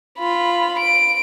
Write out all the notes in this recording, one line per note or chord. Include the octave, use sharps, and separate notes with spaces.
F4 B5
D7